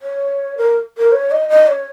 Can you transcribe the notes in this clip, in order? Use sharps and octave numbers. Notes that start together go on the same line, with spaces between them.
C#5
A#4
A#4
C#5
D#5
D#5
C#5